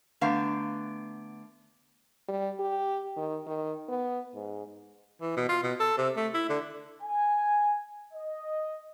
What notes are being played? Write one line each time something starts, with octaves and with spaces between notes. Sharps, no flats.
D3 A3 B3 F5 A#5
G3
G4
D#3
D#3
B3
G#2
E3
B2
F4
B2
A4
C3
A3
E4
D3
G#5
D#5